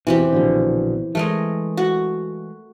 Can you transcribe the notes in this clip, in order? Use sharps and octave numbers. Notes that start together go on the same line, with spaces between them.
E2 B2 E3 C4 G4
A#1 B2 D3
E3 G#3 A3 A#4 D#5
F#4